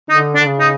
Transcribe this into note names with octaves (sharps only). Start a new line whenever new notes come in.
D3 D#4
D4
D3
C#3
D#4